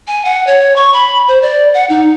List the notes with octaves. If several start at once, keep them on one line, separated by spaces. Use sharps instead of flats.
G#5
F#5
C#5
C#6
B5
C5
D5
F#5
D#4